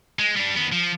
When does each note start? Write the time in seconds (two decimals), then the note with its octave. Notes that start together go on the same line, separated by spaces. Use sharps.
0.19 G#3
0.36 G3 D4
0.56 D#3 B3
0.72 F3